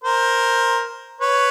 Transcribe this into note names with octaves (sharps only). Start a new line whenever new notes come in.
A#4 C5
B4 C#5